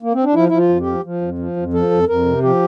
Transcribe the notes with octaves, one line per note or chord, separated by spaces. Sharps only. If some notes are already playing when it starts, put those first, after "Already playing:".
A#3
C4
D4
F3 E4
F3 E4
F4
F2
G4
F3
F3
F2
F3
F2
F3 A4
F2
F2 A#4
C3
F3 G4